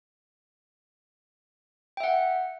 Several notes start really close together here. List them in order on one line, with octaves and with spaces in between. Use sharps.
G5 E5 F#5